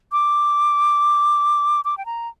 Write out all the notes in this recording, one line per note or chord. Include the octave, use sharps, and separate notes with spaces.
D6
D6
G5
A#5